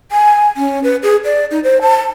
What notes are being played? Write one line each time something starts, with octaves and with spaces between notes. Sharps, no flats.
G#5
C#4
B4
G#4
D5
D#4
C5
A5